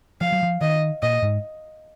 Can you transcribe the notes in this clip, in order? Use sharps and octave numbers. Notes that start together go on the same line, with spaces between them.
F3 F5
F#3
F3
D#3 D#5
A#2 D#5
G#2